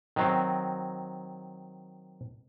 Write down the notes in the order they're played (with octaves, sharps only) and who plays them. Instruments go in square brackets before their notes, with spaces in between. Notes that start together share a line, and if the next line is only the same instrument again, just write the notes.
[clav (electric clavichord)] D#3 F#3 C4